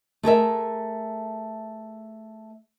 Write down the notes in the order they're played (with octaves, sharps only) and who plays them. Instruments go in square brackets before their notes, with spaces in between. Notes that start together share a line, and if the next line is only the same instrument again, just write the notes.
[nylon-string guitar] A3 G#4 A#4 E5